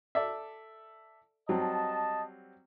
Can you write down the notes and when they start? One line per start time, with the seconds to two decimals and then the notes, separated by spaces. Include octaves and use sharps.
0.15 A4 D5 E5
1.49 F#3 G3 C4 D#5 A5